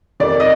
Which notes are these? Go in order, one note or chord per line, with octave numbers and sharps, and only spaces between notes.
F2 C3 D#3 D5
D#5